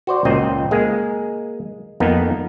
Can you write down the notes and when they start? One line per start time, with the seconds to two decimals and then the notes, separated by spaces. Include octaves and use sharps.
0.07 F#4 C5 D5
0.25 C#2 A#2 C4 D#5
0.71 G#3 A#3 G#4
2.00 F2 A#3 B3 D#4